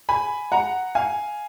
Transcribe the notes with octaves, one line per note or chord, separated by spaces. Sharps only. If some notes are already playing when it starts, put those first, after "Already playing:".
G#5 B5
F#5 A#5
F5 G#5